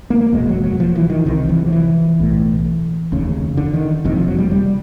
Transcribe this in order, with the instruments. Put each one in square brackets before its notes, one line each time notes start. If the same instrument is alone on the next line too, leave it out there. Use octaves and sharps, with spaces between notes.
[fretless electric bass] A#3
A#3
F#1 E2 B2 G#3
F#3
F#3
F3
E3
D#3
C2 C3 D#3
E3
F3
E3
B1 A2
F1 D#2 C#3
D3
D#3
F#1 F2 C3 D#3
F3
F#3
G3
G3